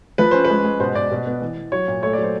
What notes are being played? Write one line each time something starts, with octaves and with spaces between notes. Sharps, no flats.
F3 B4
C#4 C5
B4
G#3
G#3
B2 C5
B2 D5
B2
B3
E3
E3
F#3 C#5
A#2
A3 C#5
D5
F#3 C5